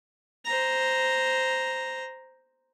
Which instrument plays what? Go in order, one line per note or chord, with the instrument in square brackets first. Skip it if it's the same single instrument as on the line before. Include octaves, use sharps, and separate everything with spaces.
[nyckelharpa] C5 A#5